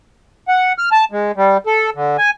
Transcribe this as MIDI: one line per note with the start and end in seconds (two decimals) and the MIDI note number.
0.48 0.73 78
0.78 0.89 89
0.92 1.05 81
1.12 1.32 56
1.37 1.57 55
1.66 1.90 69
1.95 2.17 50
2.18 2.30 80